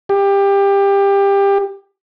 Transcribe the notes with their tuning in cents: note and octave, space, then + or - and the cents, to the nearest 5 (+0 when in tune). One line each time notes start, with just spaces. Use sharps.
G4 +20